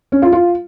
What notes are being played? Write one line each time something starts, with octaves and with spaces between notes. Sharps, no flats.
C#4
F4
F4